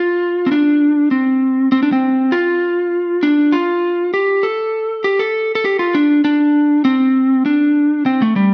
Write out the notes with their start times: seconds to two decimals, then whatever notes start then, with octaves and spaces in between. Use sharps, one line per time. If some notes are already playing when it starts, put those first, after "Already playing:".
Already playing: F4
0.46 C4
0.52 D4
1.11 C4
1.72 C4
1.83 D4
1.92 C4
2.32 F4
3.23 D4
3.52 F4
4.14 G4
4.43 A4
5.04 G4
5.19 A4
5.55 A4
5.65 G4
5.79 F4
5.95 D4
6.25 D4
6.85 C4
7.46 D4
8.06 C4
8.22 A3
8.36 G3